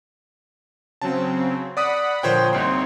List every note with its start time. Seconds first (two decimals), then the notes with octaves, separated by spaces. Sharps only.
1.02 C#3 F#3 C4 A5
1.77 D5 F#5 B5 D#6
2.23 A#2 D3 F3 C5 C#5 G5
2.53 C2 C4 D#4 C#5 C6